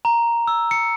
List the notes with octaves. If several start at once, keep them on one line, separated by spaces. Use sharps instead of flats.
A#5
E6
C#7